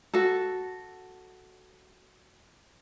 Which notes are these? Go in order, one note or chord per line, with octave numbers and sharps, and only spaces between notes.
F#4 A4